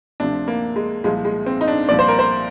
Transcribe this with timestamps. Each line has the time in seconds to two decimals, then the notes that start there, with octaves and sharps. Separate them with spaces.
0.20 D2 C3 F3 D4
0.48 A#3
0.76 G#3
1.04 C2 A#2 F3 G#3
1.25 G#3
1.46 C4
1.61 D#4
1.68 D4
1.89 C2 A#2 F3 D5
1.99 C5
2.08 A#4
2.19 C5